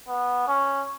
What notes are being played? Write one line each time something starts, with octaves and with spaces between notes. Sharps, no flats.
B3
C#4